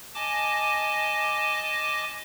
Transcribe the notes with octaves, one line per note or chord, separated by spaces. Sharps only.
D#5 G#5 A5 D6